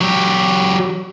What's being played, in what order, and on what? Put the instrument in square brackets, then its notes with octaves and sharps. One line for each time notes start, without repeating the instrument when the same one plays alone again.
[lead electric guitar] F#3 G4